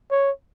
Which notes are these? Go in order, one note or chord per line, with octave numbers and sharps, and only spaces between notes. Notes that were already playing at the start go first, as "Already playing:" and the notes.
C#5